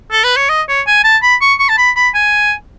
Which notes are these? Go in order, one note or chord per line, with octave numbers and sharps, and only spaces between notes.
A4
B4
C#5
D#5
C#5
G#5
A5
B5
C#6
C#6
A5
B5
B5
G#5